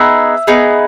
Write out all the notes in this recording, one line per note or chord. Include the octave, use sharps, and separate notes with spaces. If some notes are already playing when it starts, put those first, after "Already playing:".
Already playing: B3 D#4 G#4 E5
B3 D#4 G#4